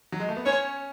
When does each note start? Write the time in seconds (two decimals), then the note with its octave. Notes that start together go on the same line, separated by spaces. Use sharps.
0.12 F#3
0.20 G#3
0.29 A3
0.37 B3
0.46 C#4 C#5